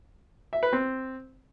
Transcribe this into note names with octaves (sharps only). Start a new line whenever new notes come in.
E5
B4
C4